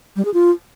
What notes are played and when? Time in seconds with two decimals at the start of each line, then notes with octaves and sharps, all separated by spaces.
0.16 G3
0.25 G#4
0.34 F4